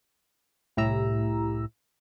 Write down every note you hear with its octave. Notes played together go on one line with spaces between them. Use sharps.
C2 A2 E4 G4 A#5 E6